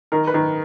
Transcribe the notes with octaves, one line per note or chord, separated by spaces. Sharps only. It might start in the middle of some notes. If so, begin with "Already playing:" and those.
D#3 A#4
B4
D#3